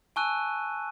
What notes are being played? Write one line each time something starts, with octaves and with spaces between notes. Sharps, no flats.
G#5 A5 C#6 E6 F#6 D#7